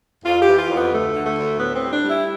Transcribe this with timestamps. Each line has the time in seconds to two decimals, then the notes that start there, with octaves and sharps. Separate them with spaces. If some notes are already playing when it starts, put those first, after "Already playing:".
0.24 F2 F4
0.42 G4
0.47 E3
0.58 F4
0.69 F2
0.75 B3
0.91 D2 A3
1.14 D3
1.26 A3
1.37 D2
1.59 A2 B3
1.75 C4
1.81 G3
1.93 D4
2.03 G3
2.09 E4